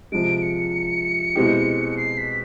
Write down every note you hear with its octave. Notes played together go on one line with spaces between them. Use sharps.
C3 F3 G#3 D7
C#7
B2 G#3 C4 E4 G4
C7
B6